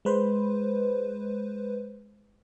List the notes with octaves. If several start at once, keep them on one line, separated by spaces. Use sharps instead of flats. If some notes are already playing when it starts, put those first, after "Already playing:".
G#3 B4 C5